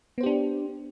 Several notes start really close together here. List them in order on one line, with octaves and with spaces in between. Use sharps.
B3 C5 G4 D4